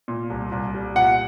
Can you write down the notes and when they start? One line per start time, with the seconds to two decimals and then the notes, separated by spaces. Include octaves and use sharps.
0.08 A#2
0.30 C2
0.52 C2
0.74 G3
0.95 A#2 F#5